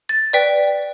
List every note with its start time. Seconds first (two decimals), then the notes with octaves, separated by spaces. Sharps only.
0.09 A6
0.33 B4 D5 G5 B6